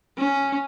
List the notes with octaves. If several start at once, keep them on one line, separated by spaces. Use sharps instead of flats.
C#4